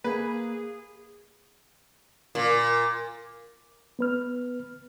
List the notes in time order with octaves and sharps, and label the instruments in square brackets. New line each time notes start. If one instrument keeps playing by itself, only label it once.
[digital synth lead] A#3 [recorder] G#4 [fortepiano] B4
[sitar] A#2
[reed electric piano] B3 B4 F6